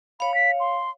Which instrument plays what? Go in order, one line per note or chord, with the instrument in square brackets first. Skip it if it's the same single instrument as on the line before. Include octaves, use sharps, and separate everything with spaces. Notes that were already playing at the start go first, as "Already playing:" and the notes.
[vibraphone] C#5 F5 [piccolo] B5
[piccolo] B6
C6